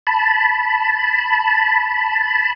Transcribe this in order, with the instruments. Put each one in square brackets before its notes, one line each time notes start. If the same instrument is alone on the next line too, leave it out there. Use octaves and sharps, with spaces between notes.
[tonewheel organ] A5 B5